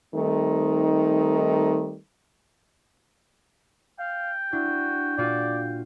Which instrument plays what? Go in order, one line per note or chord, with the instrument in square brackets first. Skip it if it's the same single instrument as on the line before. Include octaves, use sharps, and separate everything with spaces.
[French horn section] D#3 G3 A3 C4 D#4
[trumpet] F5 [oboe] G5
[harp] D4 E4 [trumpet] F#4
[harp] A#2 F4 F#4 [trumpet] D5